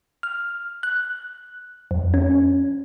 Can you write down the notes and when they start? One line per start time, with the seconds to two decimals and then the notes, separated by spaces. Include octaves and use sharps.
0.23 F6
0.83 F#6
1.91 F2
2.14 C#4